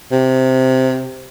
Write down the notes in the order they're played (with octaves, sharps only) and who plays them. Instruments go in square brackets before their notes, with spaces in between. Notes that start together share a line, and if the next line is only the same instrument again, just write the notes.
[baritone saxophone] C3